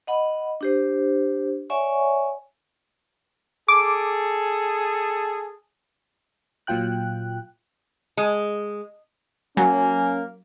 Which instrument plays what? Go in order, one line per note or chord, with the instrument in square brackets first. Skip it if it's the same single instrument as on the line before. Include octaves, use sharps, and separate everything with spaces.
[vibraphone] D#5 F#5 B5
D4 G4 C5
C#5 D5 E5 F#5 G#5 C#6
[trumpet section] G#4 A4 [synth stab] D6
[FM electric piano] A#2 F#3 F4 G5 F#6
[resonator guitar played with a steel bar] G#3
[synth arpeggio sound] F#3 [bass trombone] A#3 [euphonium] C#4 [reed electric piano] G#5